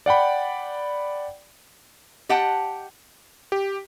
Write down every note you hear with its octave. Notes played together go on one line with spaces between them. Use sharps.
D5 F#5 G5 B5
G4 D#5 F#5 G5 A5
G4